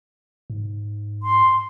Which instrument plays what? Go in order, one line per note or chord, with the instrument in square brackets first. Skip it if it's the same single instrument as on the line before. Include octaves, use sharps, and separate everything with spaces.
[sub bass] G#2
[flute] C6